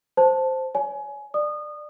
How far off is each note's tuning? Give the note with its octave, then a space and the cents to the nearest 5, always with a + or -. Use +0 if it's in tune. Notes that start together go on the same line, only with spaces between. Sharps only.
C5 +0 A5 +0
C#5 +40 G#5 +20
D5 +20 D#6 -25